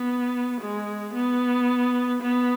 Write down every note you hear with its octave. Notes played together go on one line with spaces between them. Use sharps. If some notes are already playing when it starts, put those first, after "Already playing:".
Already playing: B3
G#3
B3
B3